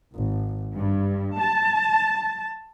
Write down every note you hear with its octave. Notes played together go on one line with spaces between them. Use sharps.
G#1
G2
A5